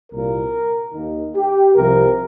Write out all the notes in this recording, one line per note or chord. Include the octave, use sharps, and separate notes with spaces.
C2 A#2 A#3 A#4
D#2 D#3 A#3 D#4
G4
C2 C3 F3 A#4